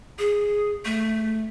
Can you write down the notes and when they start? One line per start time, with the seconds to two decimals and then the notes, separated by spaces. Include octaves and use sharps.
0.19 G#4
0.85 A3